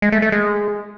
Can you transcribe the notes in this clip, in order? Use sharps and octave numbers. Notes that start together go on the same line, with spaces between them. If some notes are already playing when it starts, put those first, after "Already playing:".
G#3
A3
A3
G#3